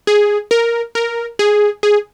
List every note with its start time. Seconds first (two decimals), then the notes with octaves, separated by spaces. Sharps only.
0.07 G#4
0.51 A#4
0.95 A#4
1.39 G#4
1.83 G#4